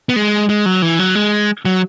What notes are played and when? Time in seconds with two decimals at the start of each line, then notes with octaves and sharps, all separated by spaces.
0.09 B3
0.16 G#3
0.49 G#3
0.66 F#3
0.82 E3
0.99 F#3
1.15 G#3
1.65 F#3